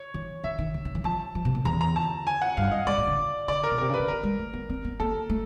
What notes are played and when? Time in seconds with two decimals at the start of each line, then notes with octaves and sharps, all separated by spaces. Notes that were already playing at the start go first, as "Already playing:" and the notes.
Already playing: C#5
0.14 E3
0.44 E3 E5
0.59 D#3
0.74 D3
0.85 D#3
0.95 E3
1.04 F3 A5
1.35 F3
1.45 B2
1.55 A#2
1.65 E2 A#5
1.81 A#5
1.96 A5
2.27 G#5
2.42 F#5
2.57 G2 F5
2.72 D#5
2.87 G#2 D5
2.98 A2
3.07 D3
3.48 D3 D5
3.64 A#4
3.71 B2
3.78 C3 A#4
3.89 C#3 B4
3.99 D3
4.08 D#3 A#4
4.23 G#3
4.39 A3
4.53 B3
4.69 C4
4.85 B3
5.00 A#3 A4
5.30 A3